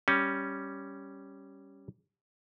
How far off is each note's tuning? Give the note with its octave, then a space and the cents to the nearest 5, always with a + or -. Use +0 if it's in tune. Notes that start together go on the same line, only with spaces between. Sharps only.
G3 +0 C#4 +0